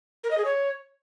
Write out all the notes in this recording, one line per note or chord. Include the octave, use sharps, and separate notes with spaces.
A#4
D#5
G#4
C#5